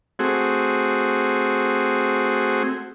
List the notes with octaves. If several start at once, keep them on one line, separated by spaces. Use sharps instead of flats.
A3 C4 F#4 G#4